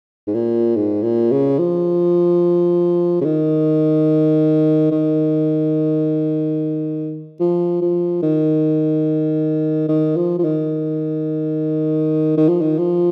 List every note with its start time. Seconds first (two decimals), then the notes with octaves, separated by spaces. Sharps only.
0.27 G#2
0.35 A#2
0.76 G#2
1.03 A#2
1.32 C#3
1.59 F3
3.21 C#3
3.25 D#3
4.91 D#3
7.40 F3
7.82 F3
8.23 D#3
9.89 D#3
10.16 F3
10.39 F3
10.44 D#3
12.37 D#3
12.49 F3
12.61 D#3
12.79 F3